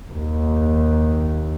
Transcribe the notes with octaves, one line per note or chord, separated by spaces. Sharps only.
D#2